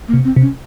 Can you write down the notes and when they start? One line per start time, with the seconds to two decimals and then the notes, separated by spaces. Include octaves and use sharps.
0.08 A#3
0.14 C3
0.25 C4
0.36 C3
0.42 C#4